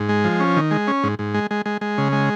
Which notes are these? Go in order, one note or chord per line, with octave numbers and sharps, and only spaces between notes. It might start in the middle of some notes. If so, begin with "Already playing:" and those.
Already playing: G#2
G#3
F3
C#4
D#3
G#3
C#4
G#2
G#2
G#3
G#3
G#3
G#3
C#3
G#3